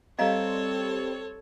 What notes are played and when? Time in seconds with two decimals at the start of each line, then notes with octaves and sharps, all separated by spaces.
0.19 G3 C4 A4 C#5 D#5 F5 A#5